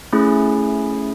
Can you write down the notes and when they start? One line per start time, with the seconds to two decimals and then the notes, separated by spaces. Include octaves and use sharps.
0.13 A3 C#4 E4 G#4